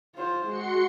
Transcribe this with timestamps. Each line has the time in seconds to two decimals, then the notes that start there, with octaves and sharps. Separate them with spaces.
0.15 F4 C5
0.45 G#3 F#4 C6 C#7